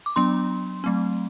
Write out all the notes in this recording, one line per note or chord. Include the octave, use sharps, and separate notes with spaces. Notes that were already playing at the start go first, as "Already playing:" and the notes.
D6
F#3 B3 D4 C6
F#3 A3 C4